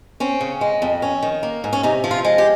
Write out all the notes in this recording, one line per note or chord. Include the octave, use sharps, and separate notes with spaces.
C4 C#4
C#3
G#3
F2
C#4
D#3
A#3
G#2
C#4
C3 D#4
F3
F4
G#3
G4